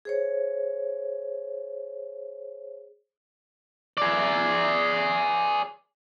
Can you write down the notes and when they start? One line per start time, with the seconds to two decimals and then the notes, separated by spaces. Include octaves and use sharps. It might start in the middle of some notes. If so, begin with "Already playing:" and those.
0.05 G#4 C5 C#5
3.97 G#4 D5